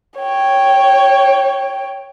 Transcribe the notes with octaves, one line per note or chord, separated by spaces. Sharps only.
C#5 G5